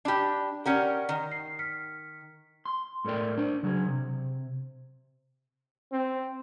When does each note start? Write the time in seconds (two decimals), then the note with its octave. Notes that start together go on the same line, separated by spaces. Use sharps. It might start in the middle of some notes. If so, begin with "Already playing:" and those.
0.05 D4 G4 A5 B5
0.65 C#4 G4 A#4 D5 F#5
1.09 D#3
1.31 C7
1.59 F6 B6 C#7
2.65 C6
3.05 A2 A4 A#4 D5 G5
3.38 D4 C5
3.63 C#3 F#3 G#4
3.88 C3
5.92 C4